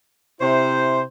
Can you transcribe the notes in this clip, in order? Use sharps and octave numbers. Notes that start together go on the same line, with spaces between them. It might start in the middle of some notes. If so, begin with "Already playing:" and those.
C3 E4 C5